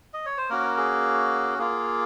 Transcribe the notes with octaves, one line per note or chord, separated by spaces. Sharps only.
D#5
C#5
C5
A#3 C#4 F#4 A#4
G#4
A#3 F4 G#4